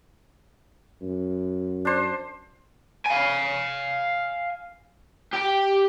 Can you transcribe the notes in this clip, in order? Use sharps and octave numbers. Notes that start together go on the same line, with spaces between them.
F#2
D4 C5
F5 G#5
G4 G5